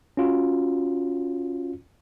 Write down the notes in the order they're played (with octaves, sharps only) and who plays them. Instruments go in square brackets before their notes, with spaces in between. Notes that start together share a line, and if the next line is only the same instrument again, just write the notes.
[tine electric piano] C#4 F4 F#4